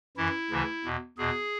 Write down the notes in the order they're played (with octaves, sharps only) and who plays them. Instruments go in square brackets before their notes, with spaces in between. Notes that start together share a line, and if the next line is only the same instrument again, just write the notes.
[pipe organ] F#2 E3 E4
D2 C#3 E3
E2 B2
E2 B2 G#4